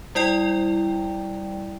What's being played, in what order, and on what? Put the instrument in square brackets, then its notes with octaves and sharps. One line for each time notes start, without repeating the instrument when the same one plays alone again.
[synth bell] G3 E4 D5 G5